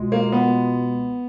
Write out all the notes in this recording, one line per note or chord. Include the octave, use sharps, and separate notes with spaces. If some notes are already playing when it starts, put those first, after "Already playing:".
Already playing: C#2 B2 G#3
A#3
B3